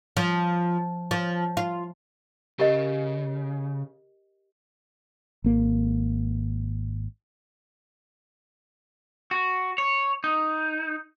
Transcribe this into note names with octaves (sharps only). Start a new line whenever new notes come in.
F3
F3
F4
C#3 G4 A#4 D#5
G#1 A#3
F#4
C#5
D#4